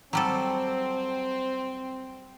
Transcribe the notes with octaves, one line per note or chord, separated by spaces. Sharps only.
F#3 G3 C4 A4